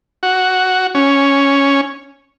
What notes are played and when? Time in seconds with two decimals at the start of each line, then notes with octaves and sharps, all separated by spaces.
0.23 F#4
0.95 C#4